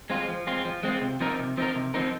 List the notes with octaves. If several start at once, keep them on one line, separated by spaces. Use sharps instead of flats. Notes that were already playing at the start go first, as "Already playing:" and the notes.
G#3 C4 F4
F3
G#3 C4 F4
F3
G#3 C4 F4
C3
F3 C4 D#4 A#4
C3
F3 C4 D#4 A#4
C3
F3 C4 D#4 A#4